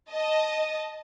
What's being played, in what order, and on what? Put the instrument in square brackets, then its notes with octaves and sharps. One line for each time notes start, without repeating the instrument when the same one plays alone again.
[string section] D#5 A5